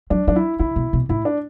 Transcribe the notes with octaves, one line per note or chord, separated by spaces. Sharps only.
F#3 D4
F#3 D4
E4
D3 E4
B2
B2
A2 E4
D4